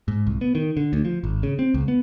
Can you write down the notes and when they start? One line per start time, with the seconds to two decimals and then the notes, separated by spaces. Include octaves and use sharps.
0.08 G#2
0.27 C2
0.41 B3
0.55 D#3
0.77 D3
0.93 D2
1.05 F3
1.24 G#1
1.43 C#3
1.59 C4
1.74 C#2
1.88 B3